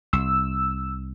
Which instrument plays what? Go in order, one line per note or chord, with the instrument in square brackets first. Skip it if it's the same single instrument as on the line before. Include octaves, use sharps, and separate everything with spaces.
[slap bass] C2 [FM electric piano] E6